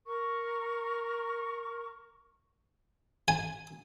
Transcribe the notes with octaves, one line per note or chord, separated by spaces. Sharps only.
A#4 C#6
G#5